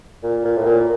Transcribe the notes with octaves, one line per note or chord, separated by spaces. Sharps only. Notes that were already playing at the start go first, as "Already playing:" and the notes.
A#2
A#2
A2
A#2